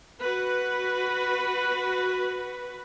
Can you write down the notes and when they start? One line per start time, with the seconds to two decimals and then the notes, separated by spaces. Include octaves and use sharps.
0.22 F#4 B4